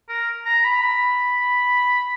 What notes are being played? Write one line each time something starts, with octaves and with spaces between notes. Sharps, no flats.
A#4
A#5
B5
B5